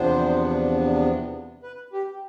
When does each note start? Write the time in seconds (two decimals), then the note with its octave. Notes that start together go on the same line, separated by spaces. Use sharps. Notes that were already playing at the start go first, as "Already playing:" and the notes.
Already playing: E2 C3 F3 B3 D4 C5
1.63 B4
1.93 G4